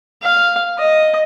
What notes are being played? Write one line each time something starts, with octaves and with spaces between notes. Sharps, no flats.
F5
D#5